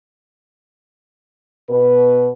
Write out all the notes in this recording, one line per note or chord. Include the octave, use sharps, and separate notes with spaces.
B2 B4